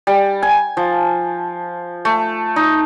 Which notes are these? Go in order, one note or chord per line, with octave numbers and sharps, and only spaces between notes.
G3
G#5
F3
A3
D#4